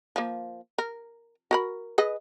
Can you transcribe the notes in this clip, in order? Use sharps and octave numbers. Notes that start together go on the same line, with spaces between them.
F3 A#3
A#4
F#4 A#4 B5
G#4 B4 D#5